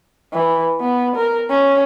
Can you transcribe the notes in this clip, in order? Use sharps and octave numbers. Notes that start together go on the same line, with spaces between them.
E3
B3
A#4
C#4